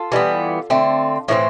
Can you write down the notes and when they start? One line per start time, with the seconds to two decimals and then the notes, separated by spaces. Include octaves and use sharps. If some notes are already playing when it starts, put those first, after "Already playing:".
Already playing: F4 A4
0.12 E3 G3 B3
0.70 D3 A3 C4
1.28 A2 E3 A3 C4